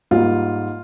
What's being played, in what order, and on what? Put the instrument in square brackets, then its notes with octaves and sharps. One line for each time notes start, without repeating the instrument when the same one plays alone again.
[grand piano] G#2 G3 A#3 F4